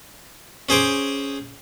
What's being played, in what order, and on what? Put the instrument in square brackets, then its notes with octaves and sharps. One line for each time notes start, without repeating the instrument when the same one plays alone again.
[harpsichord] C#4 G#4 C5 D6